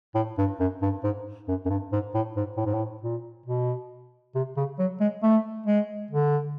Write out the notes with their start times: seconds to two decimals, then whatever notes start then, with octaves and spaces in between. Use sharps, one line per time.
0.15 A2
0.38 G2
0.60 F#2
0.82 G2
1.04 G#2
1.48 F#2
1.65 F#2
1.70 G2
1.92 G#2
2.14 A2
2.36 G#2
2.57 A2
2.66 G#2
2.74 A2
3.03 A#2
3.46 B2
4.35 C3
4.57 C#3
4.79 F#3
5.00 G#3
5.23 A3
5.66 G#3
6.11 D3